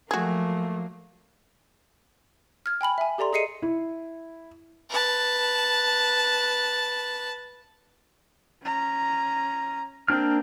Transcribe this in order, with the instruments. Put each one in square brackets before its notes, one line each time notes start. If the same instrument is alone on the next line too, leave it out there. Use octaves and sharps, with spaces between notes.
[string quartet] F3 F#3 A#3 [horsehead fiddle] A3 [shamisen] F#4 G#4
[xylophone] F6 G#6
G5 G#5 B5 F#7
E5 G#5
G4 A4 D5 A#5 C6
G#4 D#5 C7 C#7 D#7
[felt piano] E4
[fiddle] B4 A5
[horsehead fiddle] C#4 A#5
[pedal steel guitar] A#3 D4 F6 [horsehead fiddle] C4